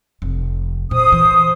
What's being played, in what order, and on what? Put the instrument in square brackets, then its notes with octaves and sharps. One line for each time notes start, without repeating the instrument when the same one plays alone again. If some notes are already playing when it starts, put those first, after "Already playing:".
[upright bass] F1
[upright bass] A#2 [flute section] C5 D#6
[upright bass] E3